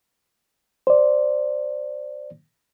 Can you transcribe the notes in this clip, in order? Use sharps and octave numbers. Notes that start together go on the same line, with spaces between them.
C5 D5